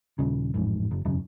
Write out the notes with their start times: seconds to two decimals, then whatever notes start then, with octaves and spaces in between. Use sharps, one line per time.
0.19 D#1 C#3
0.54 A1 F2 G#2
0.91 F#1
1.05 E1 F#2 C#3